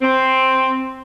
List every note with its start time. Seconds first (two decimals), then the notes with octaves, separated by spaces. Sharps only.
0.02 C4